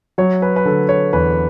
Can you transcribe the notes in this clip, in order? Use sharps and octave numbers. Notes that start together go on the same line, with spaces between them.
F#3 C#5
B4
B4
D3 A4
C#5
E2 B4